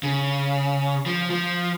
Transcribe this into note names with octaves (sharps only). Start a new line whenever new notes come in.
C#3
F3
F3